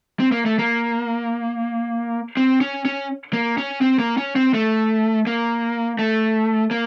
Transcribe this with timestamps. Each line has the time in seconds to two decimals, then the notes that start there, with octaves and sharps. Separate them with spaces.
0.20 C4
0.32 A#3
0.46 A3
0.59 A#3
2.37 C4
2.61 C#4
2.85 C#4
3.33 A#3
3.58 C#4
3.81 C4
3.99 A#3
4.18 C#4
4.36 C4
4.54 A3
5.27 A#3
5.99 A3
6.71 A#3